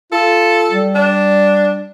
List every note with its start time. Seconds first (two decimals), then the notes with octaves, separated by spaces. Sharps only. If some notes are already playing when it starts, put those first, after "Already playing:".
0.12 F4 A4
0.72 G3
0.95 D4